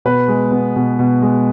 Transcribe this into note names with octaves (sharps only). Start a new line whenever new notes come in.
B2 B4
G#3
B3
B2
B2
G#3